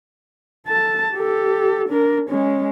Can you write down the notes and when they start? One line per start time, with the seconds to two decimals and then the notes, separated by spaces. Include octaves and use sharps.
0.67 A4 A5
1.13 G4 A4
1.88 D4 A#4
2.29 G#3 C#4